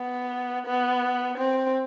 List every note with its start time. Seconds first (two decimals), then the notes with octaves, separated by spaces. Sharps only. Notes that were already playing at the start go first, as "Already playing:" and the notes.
Already playing: B3
0.66 B3
1.38 C4